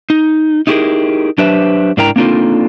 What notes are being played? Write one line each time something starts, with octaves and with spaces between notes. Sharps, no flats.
D#4
D#4 E4 G4 G#4 A#4
F#3 D4 G4 B4 C5 E5
G#2 D4 E4 A#4 G5 A#5
A#3 C4 D4 D#4 F4 A4